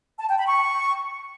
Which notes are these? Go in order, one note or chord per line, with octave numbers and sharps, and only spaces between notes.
A5
G5
B5
C#6